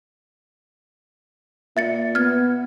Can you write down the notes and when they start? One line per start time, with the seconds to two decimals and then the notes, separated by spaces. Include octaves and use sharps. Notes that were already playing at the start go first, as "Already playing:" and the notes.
1.77 A#2 E5 A6 C#7
2.15 B3 F6 G#6